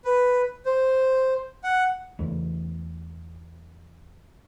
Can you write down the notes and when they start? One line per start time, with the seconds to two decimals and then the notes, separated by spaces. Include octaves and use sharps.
0.05 B4
0.65 C5
1.64 F#5
2.19 E2 E3 A3 D4